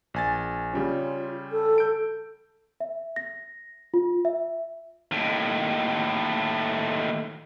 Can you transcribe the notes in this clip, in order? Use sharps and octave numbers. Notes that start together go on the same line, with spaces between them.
A#1 G#5 A6
C#3 G3 C#4 F4
A4
G6 D7
E5
A#6
F4
E5
D#2 A2